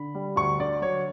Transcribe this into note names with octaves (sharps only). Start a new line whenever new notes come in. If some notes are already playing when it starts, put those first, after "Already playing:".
Already playing: D3 B5
G3
D2 C#6
D3 D5
F#3 C#5